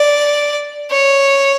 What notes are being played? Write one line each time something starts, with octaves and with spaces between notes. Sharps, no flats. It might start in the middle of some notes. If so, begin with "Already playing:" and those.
Already playing: D5
C#5